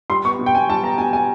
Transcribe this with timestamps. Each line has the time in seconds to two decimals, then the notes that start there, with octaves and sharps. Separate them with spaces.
0.10 G3 C6
0.25 B3 C#6
0.39 B2
0.46 G5
0.54 B2 G#5
0.69 G3 A5
0.84 B3 A#5
0.98 B2 G#5
1.13 B2 G#5